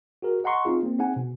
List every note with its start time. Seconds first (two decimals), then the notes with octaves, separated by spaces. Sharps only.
0.22 F#4 G#4 A#4
0.44 D#5 F#5 A#5 C6 C#6
0.65 C4 D#4 F4 G#4
0.83 A#3 C4
0.99 C4 D#4 G#4 F#5 G#5
1.16 B2